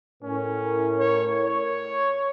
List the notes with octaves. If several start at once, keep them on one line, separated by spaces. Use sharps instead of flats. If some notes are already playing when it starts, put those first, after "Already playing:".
A2 C#4 A#4
C#5
C#5